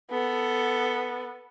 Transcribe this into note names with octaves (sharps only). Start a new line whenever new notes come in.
B3 A4